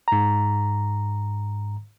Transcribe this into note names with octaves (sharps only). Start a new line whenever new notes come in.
G#2 A#5